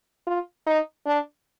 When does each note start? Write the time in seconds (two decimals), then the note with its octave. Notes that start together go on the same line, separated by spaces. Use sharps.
0.27 F4
0.66 D#4
1.06 D4